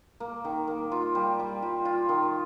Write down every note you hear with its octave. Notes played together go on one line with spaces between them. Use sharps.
A#3
D#3
A#3
F4
G3
G3
F4
F4
D#3